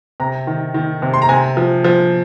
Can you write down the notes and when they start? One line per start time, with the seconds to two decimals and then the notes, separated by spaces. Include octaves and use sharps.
0.20 C3 A#5
0.47 D#3
0.74 D#3
1.02 C3
1.14 C6
1.22 A#5
1.29 C3 G#5
1.57 F3
1.84 F3